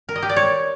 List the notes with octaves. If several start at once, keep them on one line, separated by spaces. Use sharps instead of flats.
A#4
D#5
G4
D5
C#5